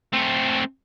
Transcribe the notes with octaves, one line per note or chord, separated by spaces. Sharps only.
A3 C4